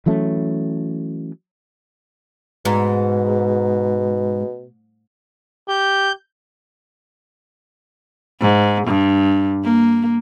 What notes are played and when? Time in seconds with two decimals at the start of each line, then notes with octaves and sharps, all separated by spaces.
0.06 E3 F#3 A3 C#4
2.65 G#2 B2
5.68 G4 G6
8.41 G#2
8.87 G2
9.64 A#3